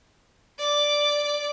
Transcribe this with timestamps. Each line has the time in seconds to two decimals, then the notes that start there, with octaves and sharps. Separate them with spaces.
0.59 D5 D6